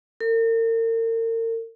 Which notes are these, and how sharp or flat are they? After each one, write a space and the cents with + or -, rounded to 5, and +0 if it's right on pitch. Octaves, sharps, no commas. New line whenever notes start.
A#4 -40